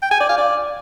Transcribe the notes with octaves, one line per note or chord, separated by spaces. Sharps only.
G5
G#5
D5
F5
D5